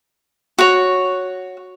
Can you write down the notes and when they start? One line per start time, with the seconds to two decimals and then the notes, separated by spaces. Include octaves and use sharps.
0.59 F#4 C#5